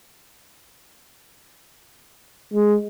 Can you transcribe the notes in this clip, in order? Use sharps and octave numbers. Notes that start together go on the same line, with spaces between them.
G#3